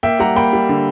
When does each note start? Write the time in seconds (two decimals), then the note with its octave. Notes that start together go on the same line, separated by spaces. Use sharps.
0.03 A#3 E5 G5
0.19 G3 F#5 A#5
0.35 A#3 G5 B5
0.53 G3
0.69 D3